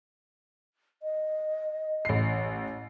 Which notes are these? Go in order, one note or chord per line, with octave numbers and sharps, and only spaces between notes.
D#5
A1 C7